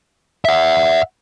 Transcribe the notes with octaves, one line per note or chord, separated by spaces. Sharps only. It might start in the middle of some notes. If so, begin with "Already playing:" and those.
E5 F#5